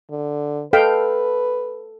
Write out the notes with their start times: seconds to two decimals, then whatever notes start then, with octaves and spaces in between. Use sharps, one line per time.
0.10 D3
0.73 A4 B4 D#5 F5 G5